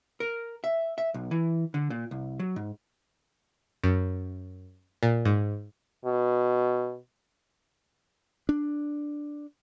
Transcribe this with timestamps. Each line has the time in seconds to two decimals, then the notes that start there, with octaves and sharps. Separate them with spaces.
0.20 A#4
0.64 E5
0.98 E5
1.14 B1
1.31 E3
1.74 D3
1.90 A#2
2.11 C2
2.39 F#3
2.56 G#2
3.84 F#2
5.03 A#2
5.25 G#2
6.05 B2
8.49 D4